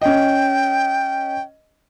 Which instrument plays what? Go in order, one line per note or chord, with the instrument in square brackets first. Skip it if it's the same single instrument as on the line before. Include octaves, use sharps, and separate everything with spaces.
[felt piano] C#4 D#5 [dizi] G5